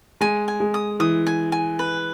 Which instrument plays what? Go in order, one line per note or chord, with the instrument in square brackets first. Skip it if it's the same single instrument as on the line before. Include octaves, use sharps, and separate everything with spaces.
[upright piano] G#3 [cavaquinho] G#5
[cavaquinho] G#5
[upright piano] G#3
[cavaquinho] D#6
[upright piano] E3 [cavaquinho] D#6
[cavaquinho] G#5
G#5
B4